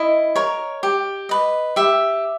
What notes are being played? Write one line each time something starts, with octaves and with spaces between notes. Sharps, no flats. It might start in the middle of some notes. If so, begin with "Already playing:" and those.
Already playing: E4 D#5
A#4 C#5
G4
B4 D#5
G4 E5